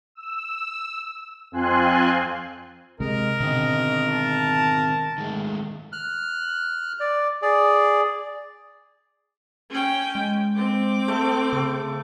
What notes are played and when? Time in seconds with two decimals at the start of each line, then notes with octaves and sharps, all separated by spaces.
0.15 E6
1.52 F2 C4 F4 G#5 C6 F#6
3.00 C3 G#3 A#4 D#5
3.40 B2 D3 D#3 C4 D#5
4.10 A5
5.18 D#3 G#3 A3
5.92 F6 F#6
7.00 D5
7.42 G#4 D5
9.71 C#4 G5
10.15 G#3
10.56 C4 D6
11.08 A3
11.53 C#3